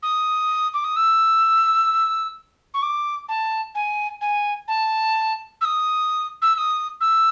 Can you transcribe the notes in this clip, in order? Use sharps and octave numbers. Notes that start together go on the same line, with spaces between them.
D#6
D6
D#6
E6
C#6
D6
A5
G#5
G#5
A5
E6
D#6
E6
E6
D#6
E6